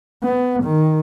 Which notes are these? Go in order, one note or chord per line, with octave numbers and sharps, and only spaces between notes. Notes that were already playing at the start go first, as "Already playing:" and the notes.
B3
D#3